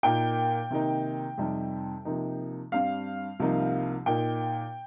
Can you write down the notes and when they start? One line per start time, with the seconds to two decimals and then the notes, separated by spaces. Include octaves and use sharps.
0.03 A#2 A#3 D#4 G5
0.71 C3 D#3 A#3 D#4
1.38 F2 C3 G3 D#4
2.05 C3 F3 A#3 D#4
2.72 G2 G3 C4 F5
3.40 C2 C3 F3 A#3 D#4
4.06 A#2 A#3 D#4 G5